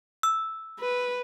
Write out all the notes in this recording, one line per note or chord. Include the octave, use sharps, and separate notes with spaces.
E6
B4